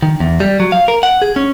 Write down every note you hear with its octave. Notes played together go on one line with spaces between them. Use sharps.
D#3
E2
G3
F#3
F5
A#4
F#5
G#4
C#4